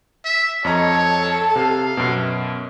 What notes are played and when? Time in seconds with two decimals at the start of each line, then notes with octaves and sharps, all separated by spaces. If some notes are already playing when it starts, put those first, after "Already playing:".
0.25 E5
0.65 F2 A4 C#5 D#5 A5 A#5
1.56 C3 F5
1.97 F#2 B2